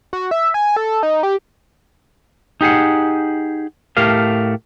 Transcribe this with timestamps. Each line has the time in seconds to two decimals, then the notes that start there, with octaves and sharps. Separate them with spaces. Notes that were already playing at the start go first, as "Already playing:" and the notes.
0.13 F#4
0.31 E5
0.54 G#5
0.76 A4
1.03 D#4
1.23 G4
2.61 D#4 G4 G#4 F#5
3.97 A2 A3 G4 A#4 F5